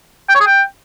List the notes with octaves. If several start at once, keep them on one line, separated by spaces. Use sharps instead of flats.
G5
C#5
G#4
G5